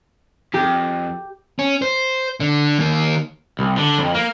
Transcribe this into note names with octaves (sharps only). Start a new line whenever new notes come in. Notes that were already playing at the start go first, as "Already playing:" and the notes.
F2 G4
C#4
C5
D3
D#3 A#3
C2
D3
F2
A#3